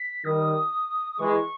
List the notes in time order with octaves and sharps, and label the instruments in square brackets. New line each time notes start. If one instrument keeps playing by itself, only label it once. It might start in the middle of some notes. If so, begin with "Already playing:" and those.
Already playing: [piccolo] B6
[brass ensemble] D#3 G3 [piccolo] D#6
[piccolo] D#6
[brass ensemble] E3 G#3 [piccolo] C#6